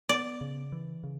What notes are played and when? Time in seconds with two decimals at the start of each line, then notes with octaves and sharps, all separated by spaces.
0.09 B3 D5
0.41 C#3
0.72 E3
1.04 C#3